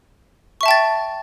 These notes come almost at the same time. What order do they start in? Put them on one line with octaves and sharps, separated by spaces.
C#6 E5 A5 G5 A6